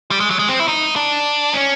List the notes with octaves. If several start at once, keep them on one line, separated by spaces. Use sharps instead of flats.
G3
G#3
F#3
G#3
C4
E4
D#4
D4
C#4